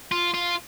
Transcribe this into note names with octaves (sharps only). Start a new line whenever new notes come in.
F4
F4